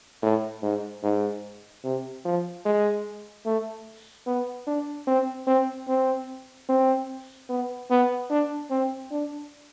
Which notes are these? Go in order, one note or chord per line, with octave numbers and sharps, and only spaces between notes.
A2
G#2
G#2
C3
F3
G#3
A3
B3
D4
C4
C4
C4
C4
B3
B3
D4
C4
D4